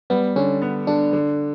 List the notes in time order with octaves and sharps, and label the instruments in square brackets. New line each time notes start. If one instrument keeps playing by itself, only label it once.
[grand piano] G3 [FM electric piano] B3
[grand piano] D3 [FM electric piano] C#4
[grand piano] B3
[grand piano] D3 [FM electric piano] D4
[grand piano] D3